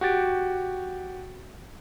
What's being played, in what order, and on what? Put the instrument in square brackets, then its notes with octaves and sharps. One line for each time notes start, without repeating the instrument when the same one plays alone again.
[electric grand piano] F#4 G4 A6 D7